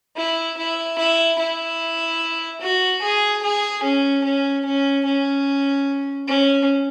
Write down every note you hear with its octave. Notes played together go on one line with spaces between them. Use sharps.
E4
E4
E4
E4
F#4
G#4
G#4
C#4
C#4
C#4
C#4
C#4